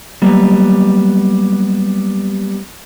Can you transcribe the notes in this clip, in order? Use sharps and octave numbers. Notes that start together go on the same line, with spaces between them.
F#3 G3 A#3 B3